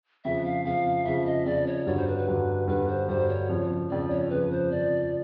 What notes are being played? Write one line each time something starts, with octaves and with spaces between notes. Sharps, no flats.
F2 C#3 F3 E5
F5
F2 C#3 F3 F5
F2 C#3 F3 E5
D#5
F2 C#3 F3 D5
C#5
G2 D3 F#3 C#5
C5
B4
B4
G2 D3 F#3
G2 D3 F#3 B4
C5
G2 D3 F#3 C5
C#5
F2 C#3 F3
F2 C#3 F3 D5
C#5
F2 C#3 F3 B4
C5
F2 C#3 F3 D5